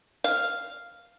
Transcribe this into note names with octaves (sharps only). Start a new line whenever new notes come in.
F5